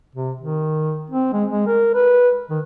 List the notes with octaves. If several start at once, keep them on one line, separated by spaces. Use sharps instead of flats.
C3
D#3
C4
G#3
G#3
A#4
B4
D#3